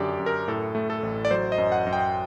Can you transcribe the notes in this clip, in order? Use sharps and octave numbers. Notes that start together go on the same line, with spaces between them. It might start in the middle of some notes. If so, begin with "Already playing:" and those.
Already playing: F#2 D3 G4 D5
F#2
A#4
A2 A4
A3
A4
A1
D5
F#3 C5
D#5
F#2
F#5
F#2
G5